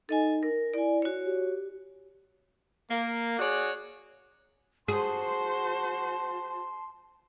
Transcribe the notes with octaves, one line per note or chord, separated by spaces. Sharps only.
D#4 A4 D#5 G#5
A#4
E4 D5 G#5
F#4 C#5
G4
A#3
F#4 G#4 C#5 D5
F#4 G#4 C5 A5 C6